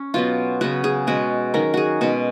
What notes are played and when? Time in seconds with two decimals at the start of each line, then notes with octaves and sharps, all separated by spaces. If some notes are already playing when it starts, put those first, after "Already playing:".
Already playing: C#4
0.14 B2 F#3 B3 F4
0.61 C#3 F#3 B3 F#4
0.84 G#4
1.07 B2 G#3 C#4 F#4
1.54 D#3 F#3 C#4 A#4
1.74 F#4 G#4
2.01 B2 G#3 C#4 F#4